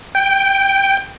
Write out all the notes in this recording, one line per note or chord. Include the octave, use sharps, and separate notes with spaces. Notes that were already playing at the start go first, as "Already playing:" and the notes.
G5